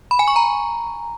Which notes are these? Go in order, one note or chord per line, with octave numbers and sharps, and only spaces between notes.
B5
G#5
C#6
A#5